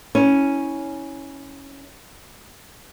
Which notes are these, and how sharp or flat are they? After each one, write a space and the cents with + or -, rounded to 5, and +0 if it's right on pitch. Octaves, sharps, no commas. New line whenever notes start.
C#4 +0 E4 -30